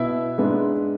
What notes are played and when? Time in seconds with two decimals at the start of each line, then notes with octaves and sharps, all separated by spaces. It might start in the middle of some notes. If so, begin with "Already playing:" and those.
Already playing: B2 B3 E4 E5
0.38 G#2 G#3 B3 D4